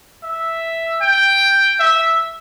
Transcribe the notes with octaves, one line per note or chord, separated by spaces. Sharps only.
E5
G5
E5